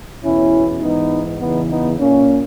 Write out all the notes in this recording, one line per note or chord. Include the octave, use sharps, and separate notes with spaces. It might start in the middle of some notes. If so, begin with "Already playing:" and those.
E2 B2 C#4 E4
G#2 E3 B3 D#4
E2 C#3 E3 B3 D#4
B3 D#4
A#2 A#3 C#4